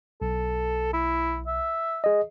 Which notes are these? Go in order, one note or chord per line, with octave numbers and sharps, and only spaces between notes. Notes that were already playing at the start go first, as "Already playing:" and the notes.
B1 A4
E4
E5
G#4 D#5